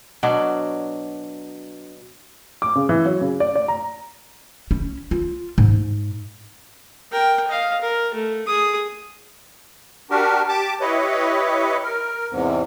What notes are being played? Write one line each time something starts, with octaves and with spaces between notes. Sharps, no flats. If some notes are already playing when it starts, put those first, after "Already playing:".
B2 F#3 D4
D6
C#3
E3
F#3
C#3
D5
D5
A#5
C#4
F4
G#2
A#4 G5
D#5 F5
A#4
A3
G#4 D#6
D4 F#4 G4 A#4
G4 A5 D6
E4 G4 B4 C#5 D#5
A#4
E2 G#2 C3